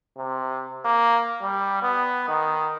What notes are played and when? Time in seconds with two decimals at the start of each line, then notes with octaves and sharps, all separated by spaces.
0.17 C3
0.85 A#3
1.42 G3
1.83 B3
2.29 D#3